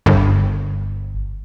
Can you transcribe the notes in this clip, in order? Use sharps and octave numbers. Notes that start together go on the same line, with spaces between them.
G1